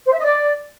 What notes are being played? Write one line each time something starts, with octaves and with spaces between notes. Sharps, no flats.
C5
E5
D#5
D5